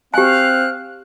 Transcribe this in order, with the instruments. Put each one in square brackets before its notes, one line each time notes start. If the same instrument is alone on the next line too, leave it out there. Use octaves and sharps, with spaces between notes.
[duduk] C4 [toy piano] G4 G#5 [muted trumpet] F5 [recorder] F#6